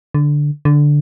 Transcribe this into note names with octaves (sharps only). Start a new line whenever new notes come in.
D3
D3